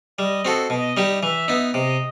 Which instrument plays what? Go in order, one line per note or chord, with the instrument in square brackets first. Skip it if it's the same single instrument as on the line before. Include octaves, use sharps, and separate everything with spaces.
[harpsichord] G3 [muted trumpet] D#5
[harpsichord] C4 F#4 A4
[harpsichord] B2 [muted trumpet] D#5
[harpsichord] G3 D#4 G4
[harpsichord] E3 [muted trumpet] E5
[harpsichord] B3 D#4
[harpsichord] C3 [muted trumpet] D#5